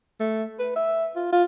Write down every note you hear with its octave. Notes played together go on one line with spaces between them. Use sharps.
A3
B4
E5
F4
F4